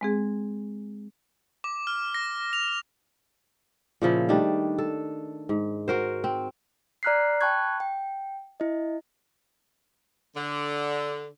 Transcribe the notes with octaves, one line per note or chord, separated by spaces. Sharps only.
G#3 C4 G#4
D6
F6
A#6
F7
A#2 C#3 F3 E4
D#3 G3 A3 D4
A4
G#2
F#4 A#4 C5
C4
D5 A#5 F6 F#6 B6 C7
G5 A5 B5 C#6 F#6 G#6
G5
E4 D#5
D3